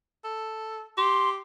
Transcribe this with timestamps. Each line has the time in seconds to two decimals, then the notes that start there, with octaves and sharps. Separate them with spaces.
0.24 A4
0.98 G4 C6